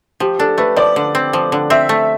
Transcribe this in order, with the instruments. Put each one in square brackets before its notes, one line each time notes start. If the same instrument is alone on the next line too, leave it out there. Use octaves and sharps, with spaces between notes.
[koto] F3 [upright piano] G4
[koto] D4 [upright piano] A4
[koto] A3 [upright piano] B4
[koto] F3 [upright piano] D5
[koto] D3
C4
F3
D3
[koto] C4 [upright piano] E5
[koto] A3